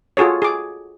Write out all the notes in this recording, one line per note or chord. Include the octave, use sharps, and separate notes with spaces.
F4 F#4 G#4 A4 C#5
G#4 D6